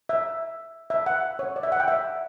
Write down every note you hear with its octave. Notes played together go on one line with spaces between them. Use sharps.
E5
E5
F#5
C#5
D5
E5
F#5
G5
E5